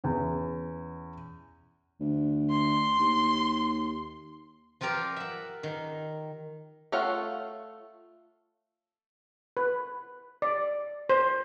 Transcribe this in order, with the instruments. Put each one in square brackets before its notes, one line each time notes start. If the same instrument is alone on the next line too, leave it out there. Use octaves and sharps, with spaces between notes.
[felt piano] E2 C#4
[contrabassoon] D2
[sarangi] C6
[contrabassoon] D#2
[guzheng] F3 F4 G4 A#4 D5
E5 F#5
D#3
[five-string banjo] A3 F4 C#5 F5 F#5
[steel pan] B4
D5
C5